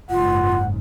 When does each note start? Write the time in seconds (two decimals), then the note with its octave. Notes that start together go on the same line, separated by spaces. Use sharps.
0.10 F#1 G#2 F4 F#5